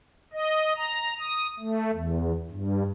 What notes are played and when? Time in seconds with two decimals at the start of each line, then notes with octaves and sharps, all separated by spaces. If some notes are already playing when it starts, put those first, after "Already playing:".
0.33 D#5
0.77 A#5
1.19 D#6
1.60 A3
1.93 E2
2.50 G2